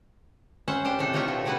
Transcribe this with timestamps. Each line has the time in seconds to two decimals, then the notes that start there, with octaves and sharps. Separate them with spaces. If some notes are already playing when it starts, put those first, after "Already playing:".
0.68 C#4 C5 E5 F#5
0.85 D4 G4 C5
0.99 A2 C3 D4 A4
1.13 F3 A3 D#4 F4 C#5 E5
1.28 B2 F3
1.45 C3 A3 B3 E4 F#4 B4